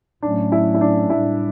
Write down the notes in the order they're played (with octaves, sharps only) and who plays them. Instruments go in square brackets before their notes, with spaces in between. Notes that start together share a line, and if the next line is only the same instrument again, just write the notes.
[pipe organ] A2 F#3 A3 C#4 [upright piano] D4
[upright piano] E4
E4
D4
[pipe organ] A2 G3 D4 [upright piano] E4